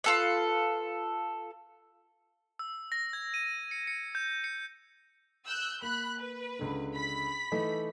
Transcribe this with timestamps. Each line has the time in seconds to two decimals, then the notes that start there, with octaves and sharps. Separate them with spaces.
0.04 F4 A4 B4
2.59 E6
2.92 A#6
3.13 G#6
3.34 D#7
3.71 C#7
3.87 C#7
4.15 G6
4.44 C#7
5.46 E6 F#6 G6
5.82 A#3 B5 F#6
6.20 B4
6.59 C#2 D3
6.94 B5 B6
7.52 E3 A3 D#4